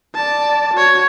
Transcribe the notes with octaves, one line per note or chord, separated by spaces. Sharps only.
D5 A5
F#4 C#5